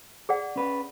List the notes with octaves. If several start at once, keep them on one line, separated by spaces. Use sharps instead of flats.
G#4 D5 F#5
C#4 B4